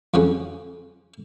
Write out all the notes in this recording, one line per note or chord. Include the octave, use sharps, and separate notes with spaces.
F2 C#3 F#3 C#4